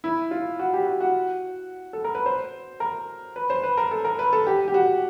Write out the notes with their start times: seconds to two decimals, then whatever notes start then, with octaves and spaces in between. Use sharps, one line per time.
0.04 E4
0.31 F4
0.59 F#4
0.74 G4
0.87 F#4
1.01 F#4
1.93 A4
2.04 A#4
2.15 B4
2.26 C5
2.80 A#4
3.36 B4
3.50 C5
3.63 B4
3.77 A#4
3.91 A4
4.05 A#4
4.19 B4
4.33 A4
4.47 G4
4.68 G4
4.74 F#4